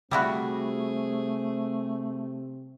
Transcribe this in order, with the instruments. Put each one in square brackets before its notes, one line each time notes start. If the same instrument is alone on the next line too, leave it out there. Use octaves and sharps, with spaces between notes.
[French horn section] C3 C4 [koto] G3 E4 F#4 [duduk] A3 [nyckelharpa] G#4